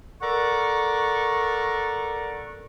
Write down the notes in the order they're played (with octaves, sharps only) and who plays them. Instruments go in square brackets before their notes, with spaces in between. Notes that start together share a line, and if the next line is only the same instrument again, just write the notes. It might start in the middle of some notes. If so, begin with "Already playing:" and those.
[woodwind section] A4 A#4 D5 F#5 A#5 C#6